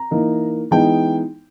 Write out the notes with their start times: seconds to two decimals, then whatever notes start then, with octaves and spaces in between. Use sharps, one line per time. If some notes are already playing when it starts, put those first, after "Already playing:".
Already playing: A#5
0.11 E3 A#3 D#4
0.71 E3 G#3 B3 D#4 G5